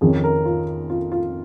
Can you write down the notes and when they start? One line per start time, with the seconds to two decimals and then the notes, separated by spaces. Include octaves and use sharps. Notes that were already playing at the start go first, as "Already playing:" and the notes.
0.01 F2 D#3 C#4 G#4
0.24 A#4
0.45 F4
0.90 F4
1.12 F4